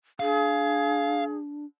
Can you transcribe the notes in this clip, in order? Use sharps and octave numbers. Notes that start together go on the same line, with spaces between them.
D4 G#4 F5